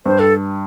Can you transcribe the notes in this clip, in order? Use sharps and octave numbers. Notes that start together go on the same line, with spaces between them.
G2 C5
A4